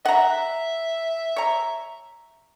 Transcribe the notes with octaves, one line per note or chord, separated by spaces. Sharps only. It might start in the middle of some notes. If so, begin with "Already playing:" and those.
E5 F#5 A#5
C#5 A#5